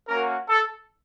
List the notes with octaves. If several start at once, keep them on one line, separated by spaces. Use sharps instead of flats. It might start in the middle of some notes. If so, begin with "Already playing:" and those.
A#3 C#4 F#4 A#4
A4